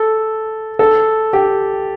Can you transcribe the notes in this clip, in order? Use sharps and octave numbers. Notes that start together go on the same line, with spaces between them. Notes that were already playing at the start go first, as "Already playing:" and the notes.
Already playing: A4
A4
G4